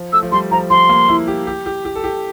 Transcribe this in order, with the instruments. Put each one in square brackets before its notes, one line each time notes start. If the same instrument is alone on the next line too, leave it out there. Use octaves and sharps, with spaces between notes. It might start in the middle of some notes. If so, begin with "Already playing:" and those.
Already playing: [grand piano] F3
[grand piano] A3 [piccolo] E6
[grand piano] F3
[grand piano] G3 [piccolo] C6
[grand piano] F3 [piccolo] A#5
[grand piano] F3 [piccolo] C6
[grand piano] A#3
E4
G4
G4
G4
G4
A4
G4